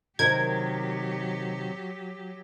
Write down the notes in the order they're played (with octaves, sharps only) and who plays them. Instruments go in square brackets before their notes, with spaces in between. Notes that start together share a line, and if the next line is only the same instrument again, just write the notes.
[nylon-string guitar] C3 D#3 A#4 [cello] F#3 G4 [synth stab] G#6